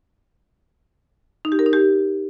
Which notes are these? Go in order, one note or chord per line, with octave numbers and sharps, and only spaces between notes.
D#4
G4
A#4
D#4
G4